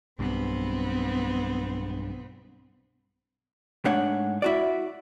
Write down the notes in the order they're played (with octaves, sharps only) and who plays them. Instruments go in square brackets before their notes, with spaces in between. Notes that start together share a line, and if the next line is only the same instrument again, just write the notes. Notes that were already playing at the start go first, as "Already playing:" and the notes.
[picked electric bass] B1 G2 [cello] B3 C4
[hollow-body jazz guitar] G#2 A3 D4 C#5 F#5
E4 F#4 D5